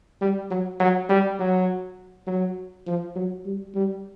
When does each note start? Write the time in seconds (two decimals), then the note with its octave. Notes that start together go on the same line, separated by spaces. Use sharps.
0.21 G3
0.51 F#3
0.80 F#3
1.09 G3
1.39 F#3
2.27 F#3
2.87 F3
3.15 F#3
3.45 G3
3.75 G3